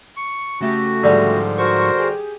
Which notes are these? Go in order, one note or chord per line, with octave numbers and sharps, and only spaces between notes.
C#6
C#3 A3 F#4 G4
G#2 D3 F3 G3
F#4 A#4 C5 C#6
G4 G#4